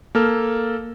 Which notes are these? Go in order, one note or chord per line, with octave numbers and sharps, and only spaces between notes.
A#3 A4 F6